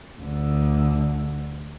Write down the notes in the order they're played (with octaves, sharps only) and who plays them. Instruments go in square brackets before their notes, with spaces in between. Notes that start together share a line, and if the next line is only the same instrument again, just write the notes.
[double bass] D2 D3